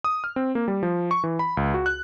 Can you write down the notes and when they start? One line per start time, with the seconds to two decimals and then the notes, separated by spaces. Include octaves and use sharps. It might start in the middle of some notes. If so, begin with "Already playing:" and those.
0.04 D#6
0.24 F6
0.36 C4
0.55 A#3
0.68 G3
0.83 F3
1.11 C#6
1.24 E3
1.39 B5
1.57 C#2
1.74 F#4
1.86 F#6